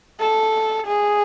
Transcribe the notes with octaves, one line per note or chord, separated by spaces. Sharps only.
A4
G#4